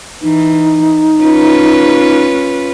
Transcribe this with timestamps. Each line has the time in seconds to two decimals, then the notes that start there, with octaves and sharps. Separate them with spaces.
0.22 E3 D#4
1.21 C#4 F4 B4